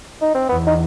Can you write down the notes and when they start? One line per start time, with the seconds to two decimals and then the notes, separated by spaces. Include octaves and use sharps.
0.21 D#4
0.35 C4
0.49 E2 B3
0.67 D#4